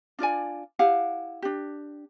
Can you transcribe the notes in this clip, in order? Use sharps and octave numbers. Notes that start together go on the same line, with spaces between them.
D4 F4 D5 G#5
E4 G4 F5 F#5
D4 G4